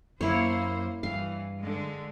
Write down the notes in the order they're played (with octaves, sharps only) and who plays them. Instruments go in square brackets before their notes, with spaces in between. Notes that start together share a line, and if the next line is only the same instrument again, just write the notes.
[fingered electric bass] F#2 [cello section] A#3 C5 [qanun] E4 C#5
[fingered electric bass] G2 [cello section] E3 [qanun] F5
[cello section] D3 G#3